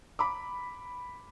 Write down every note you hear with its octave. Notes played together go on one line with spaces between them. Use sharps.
B5 D6